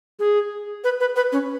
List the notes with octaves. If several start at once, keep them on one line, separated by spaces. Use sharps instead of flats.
G#4
B4
B4
B4
C#4